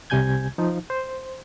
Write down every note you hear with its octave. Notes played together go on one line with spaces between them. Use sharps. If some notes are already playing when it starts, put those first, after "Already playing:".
C2 C3 G3 G#5 G6 G#6
F3 D#4
C5